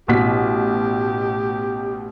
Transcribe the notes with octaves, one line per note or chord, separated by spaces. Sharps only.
A1 B2 G4 B6